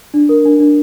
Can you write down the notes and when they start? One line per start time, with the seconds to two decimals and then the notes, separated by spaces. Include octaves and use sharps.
0.14 D4
0.29 A#4
0.45 D4
0.60 D4